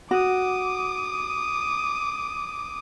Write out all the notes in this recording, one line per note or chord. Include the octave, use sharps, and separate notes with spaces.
F#4 D6 D#6